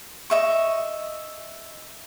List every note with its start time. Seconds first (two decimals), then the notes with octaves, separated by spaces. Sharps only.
0.30 D#5 E5 C#6